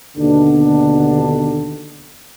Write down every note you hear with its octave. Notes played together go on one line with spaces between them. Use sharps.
D#2 B2 D3 D4